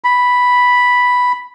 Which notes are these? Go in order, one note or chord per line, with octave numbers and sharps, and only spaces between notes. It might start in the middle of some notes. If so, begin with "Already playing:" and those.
B5